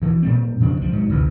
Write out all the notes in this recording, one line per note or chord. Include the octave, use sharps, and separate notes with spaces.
D2 E3
A#2 G3 C4
F2 C#3 D4
C2 F3 G3
G#2 F#3
A1 D2 C3 E3